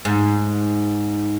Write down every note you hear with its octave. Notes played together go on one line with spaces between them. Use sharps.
G#2